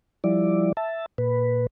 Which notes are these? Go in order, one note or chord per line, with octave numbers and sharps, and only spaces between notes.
F3 G3 E4 D5
E5 A5
A#2 B4